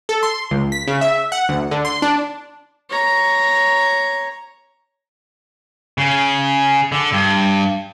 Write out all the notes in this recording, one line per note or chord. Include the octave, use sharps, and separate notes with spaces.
A4
C6
C#2
B6
C#3
E5
F#5
D2
D3
C6
D4
C#5 A#5
C#3
D3
G2